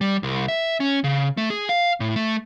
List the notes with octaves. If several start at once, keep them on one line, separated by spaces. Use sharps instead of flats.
G3
C2
E5
C#4
C#3
A3
G#4
F5
A2
A3